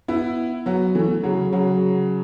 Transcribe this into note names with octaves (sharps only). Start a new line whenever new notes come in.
B3 E4
F#3 B3
E3 A3
C#3 F#3
C#3 F#3